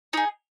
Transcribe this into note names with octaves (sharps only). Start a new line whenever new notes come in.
D#4 G#4